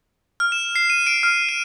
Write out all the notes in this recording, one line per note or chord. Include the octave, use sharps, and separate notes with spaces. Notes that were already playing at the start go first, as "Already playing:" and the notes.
F6
E7
C7
D#7
D7
F6
D#7